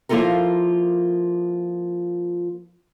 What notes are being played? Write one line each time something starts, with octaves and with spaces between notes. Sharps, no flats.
F3 A#3 E4 F4 A4 A#4